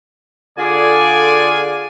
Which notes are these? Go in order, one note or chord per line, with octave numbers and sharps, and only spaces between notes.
D3 F4 G#4 A4 D5 G#5